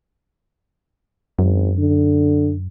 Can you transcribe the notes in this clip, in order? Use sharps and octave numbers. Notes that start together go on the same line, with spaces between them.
G#1 F#2
D3